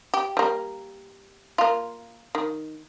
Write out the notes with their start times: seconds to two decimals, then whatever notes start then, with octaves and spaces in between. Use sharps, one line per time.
0.14 G4
0.37 G3 A#3
1.58 A#3 F4
2.35 D#3